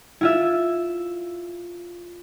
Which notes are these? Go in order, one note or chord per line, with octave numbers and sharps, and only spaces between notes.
E4 F4 E5